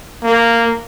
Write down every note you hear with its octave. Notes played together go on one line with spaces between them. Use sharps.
A#3